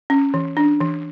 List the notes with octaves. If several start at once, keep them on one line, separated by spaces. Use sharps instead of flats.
C#4
E3
D4
E3